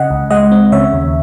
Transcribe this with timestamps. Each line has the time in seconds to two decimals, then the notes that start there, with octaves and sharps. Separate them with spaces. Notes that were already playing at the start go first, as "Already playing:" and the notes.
Already playing: C#3 D#5 F#5
0.10 C#2
0.30 G#3 D#5 F#5
0.52 C4
0.72 C#3 C#5 E5
0.93 D#2